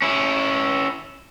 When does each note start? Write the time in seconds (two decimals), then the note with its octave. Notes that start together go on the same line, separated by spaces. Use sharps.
0.02 C#4 E4